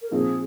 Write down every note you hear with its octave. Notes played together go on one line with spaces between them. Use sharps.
A#4
A#2 F3 C4 D#4 G#4